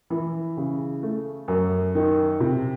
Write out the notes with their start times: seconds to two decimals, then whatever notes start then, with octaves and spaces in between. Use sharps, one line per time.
0.10 E3
0.57 C#3
1.03 A3
1.48 F#2
1.95 D#3
2.40 C3